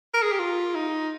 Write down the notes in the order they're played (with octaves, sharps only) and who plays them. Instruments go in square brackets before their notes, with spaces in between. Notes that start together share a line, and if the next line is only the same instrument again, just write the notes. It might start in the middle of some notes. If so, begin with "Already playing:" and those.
[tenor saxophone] A#4
G#4
G4
F4
D#4